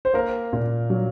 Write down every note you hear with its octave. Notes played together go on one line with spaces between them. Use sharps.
C5
A#3 A#4
A#2
F#3